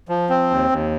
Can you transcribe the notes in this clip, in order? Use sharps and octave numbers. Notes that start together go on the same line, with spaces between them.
F3
C4
D#2
D#2